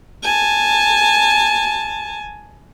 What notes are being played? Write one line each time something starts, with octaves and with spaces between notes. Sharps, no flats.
G#5 A5